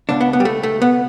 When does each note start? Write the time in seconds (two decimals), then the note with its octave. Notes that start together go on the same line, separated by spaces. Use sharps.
0.09 C#2 B2 D4
0.21 B3
0.33 B3
0.40 G3
0.45 A3
0.63 A3
0.82 B3